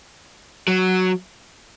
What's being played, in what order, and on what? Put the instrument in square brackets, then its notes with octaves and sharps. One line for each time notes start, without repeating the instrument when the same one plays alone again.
[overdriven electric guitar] F#3